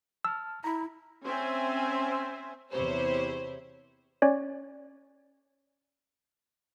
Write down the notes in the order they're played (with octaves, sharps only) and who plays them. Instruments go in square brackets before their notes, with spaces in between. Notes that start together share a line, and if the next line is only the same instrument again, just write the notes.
[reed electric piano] A5 F6 [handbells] E6
[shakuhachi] E4 [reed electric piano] A#5 B5
[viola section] C4 C#4 C5 E5 G#5
[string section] E2 C3 E4 G4 C5 C#5
[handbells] C#4 C#5 D5